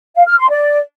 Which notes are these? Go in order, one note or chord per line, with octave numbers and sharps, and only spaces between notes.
F5
F6
C6
D5